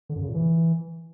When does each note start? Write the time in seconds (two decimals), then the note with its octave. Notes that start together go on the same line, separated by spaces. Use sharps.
0.09 D3
0.16 F#2
0.22 C#3
0.28 A#2
0.35 E3